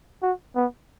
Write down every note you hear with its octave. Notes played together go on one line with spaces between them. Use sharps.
F#4
B3